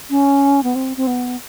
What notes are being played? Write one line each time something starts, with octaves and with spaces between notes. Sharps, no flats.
C#4
B3
C4
C4
B3